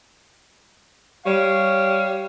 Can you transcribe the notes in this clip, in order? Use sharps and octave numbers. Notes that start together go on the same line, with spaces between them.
G3 C#5 F5